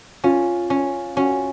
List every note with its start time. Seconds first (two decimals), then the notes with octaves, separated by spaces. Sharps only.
0.24 C#4 F4
0.70 C#4
1.16 C#4 F#4